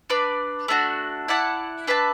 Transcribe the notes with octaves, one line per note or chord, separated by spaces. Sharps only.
D4 B4 D5
A3 D4 F#4
E4 D5 F#5 A5
D4 B4 E5 A5